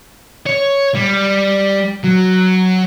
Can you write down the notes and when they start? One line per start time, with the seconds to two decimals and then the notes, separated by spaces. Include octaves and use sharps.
0.47 C#5
0.95 G3
2.04 F#3